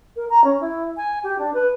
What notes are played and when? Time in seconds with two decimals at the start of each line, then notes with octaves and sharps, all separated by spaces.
0.16 A#4
0.29 A#5
0.44 C#4
0.60 E4
0.97 G#5
1.23 G4
1.39 D4
1.54 B4